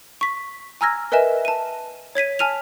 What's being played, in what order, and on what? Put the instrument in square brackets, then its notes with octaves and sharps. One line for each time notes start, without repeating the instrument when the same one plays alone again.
[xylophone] C#6 B6
G#5 A#5 E6 F6 G#6 A#6
A#4 B4 D#5 E5 G#5 E7
A5 D#7
C#5 G#6 B6 D#7
G#5 A5 F6 D#7 F7